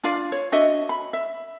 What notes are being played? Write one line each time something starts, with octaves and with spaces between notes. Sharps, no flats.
D4 F4 D5 F5
C#5
D4 F#4 D#5 E5
B5
E5